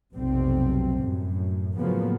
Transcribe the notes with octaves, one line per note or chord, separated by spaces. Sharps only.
F1 B1 C3 G3 C4
F#2 A2
A2 C#3 F3 F#3 A#3 B3